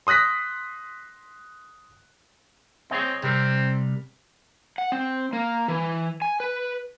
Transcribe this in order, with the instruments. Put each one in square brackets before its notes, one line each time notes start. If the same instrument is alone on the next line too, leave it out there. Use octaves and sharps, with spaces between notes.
[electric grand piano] C6 D#6 F#6 A#6 B6
[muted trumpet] C4 [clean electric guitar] G#4 C#5 D#5
[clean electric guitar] C3 G3 A#4 [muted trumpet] C4
[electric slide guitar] F#5
C4
A#3
E3
G#5
B4